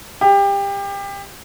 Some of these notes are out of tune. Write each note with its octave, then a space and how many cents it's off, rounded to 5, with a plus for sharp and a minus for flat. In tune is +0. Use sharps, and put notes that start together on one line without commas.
G4 +25